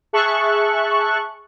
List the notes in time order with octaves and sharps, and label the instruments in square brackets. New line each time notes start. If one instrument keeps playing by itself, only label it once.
[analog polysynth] G#4 E5 A5 C#6 F#6